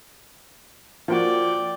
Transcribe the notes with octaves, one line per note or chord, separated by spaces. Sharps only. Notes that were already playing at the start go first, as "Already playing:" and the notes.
F3 A#3 F#4 D5 G5